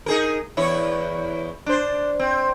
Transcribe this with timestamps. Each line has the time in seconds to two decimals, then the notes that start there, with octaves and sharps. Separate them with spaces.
0.06 D#4 G#4 A#4
0.57 E2 E4 C#5
1.66 D4 C5
2.20 C4